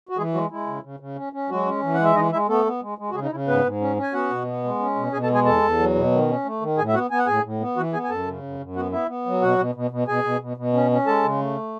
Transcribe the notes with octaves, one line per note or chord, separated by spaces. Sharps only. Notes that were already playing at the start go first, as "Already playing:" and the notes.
F#4
E3 G#3 G#4
F#3 G#3 F#4
G#3 E4
C#3
C#3
C#3
C#4
C#4
F#3 G#3 F#4
C#4
E3
F#5
G#3
E5
E3 D#4 D#5
G#3 E4 E5
A3 B3 A4
B3
G#3
G#3
F#4
C#3 G#3 G#4
D#4
C#3 E4
G#2 B3 B4
G#2
C#4
C#4
G#5
B3 F#4 F#5
B2
B3
G#3
C#4
B2
B2 G#4 G#5
A4 A5
G#3
G#4 G#5
E2 A4 A5
E2
F#3
B2
D#3
C#4
A3
D#3
A2 G#4 G#5
E5
B3 F#4 F#5
B3 G#5
F#5
A2 G#4 G#5
A2
B3
E3 F#4 F#5
B3 G#4 G#5
G#5
F#2 A4 A5
C#3
F#2
F#2
B3 F#4 F#5
B3 E4 E5
B3
F#3
B2 F#4 F#5
B2
B2
B2
B2 G#4 G#5
B2
B2
B2
C#4
C#4
G#3 A4 A5
C#3
A3